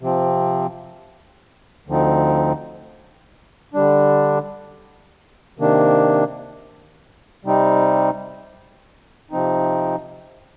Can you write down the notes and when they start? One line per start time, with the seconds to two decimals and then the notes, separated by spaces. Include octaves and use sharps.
0.01 C3 F3 C4
1.87 D2 D3 F3 C4 D#4
3.74 D3 G3 D4
5.58 C3 D#3 A#3 D4
7.45 C3 G3 C4 D#4
9.31 C3 F3 C4 D#4